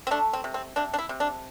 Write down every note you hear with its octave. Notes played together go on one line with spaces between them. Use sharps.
C4
A3 D4
C4
C3
C4
C3 D4
D4
E4
C3
D4